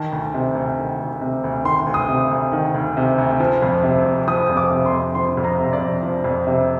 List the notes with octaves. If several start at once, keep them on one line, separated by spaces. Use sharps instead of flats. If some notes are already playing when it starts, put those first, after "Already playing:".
Already playing: D#3 A5
D2
C3
D2
D#3
D2
C3
D2
D#3 C6
D2
D#6
C3
D2
D#3
D2
C3
D2
F3
F2
C3
F2
F3 D#6
F2
D6
C3
C6
F2
F3 C6
F2
A#5
C3
D5
F2
F3
F2
C3